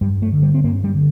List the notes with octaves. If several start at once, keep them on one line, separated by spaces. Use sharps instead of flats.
G2 G3
A3
D3
G3
C4
G2 A#3
G3
D3